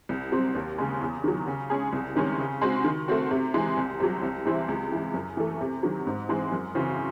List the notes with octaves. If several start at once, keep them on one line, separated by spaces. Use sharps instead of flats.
C2
C3 F#3 C4
D#2
C#3 G#3
E2
D#3 F#3
C#3
G#3 C#4 G#4
C2
C3 D#3 G#3 C#4
C#3
G#3 C4 F#4
D#3
A3 C4 F#4
C3
E3 G#3
C2
C3 F#3
C2
C3 E3 C4 E4
C#2
C3 E3
F#2
E3 A3
C3
D#3 F#3
G#2
E3 G#3 C4
F#2
C#3 E3 C4 F#4